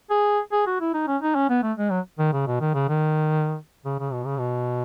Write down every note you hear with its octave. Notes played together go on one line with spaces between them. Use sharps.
G#4
G#4
F#4
E4
D#4
C#4
D#4
C#4
B3
A3
G#3
F#3
D#3
C#3
B2
D#3
C#3
D#3
C#3
C#3
B2
C#3
B2